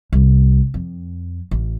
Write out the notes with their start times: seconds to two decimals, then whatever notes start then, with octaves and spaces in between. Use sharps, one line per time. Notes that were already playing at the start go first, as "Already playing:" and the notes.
0.13 C2
0.74 F2
1.51 A1